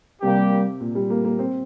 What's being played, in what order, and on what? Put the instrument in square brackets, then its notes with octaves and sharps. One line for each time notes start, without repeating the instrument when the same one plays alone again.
[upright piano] C3 [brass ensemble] G3 A#3 G4
[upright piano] A#2
G3
A#3
A#3
C4